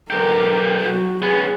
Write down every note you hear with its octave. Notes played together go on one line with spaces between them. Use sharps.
B1 G4 A#4
F#3 F#4
B3 C#4 G#4